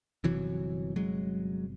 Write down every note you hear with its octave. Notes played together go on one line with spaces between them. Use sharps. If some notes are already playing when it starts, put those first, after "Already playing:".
G1 F2 C3 E3 F#3
F#3 G#3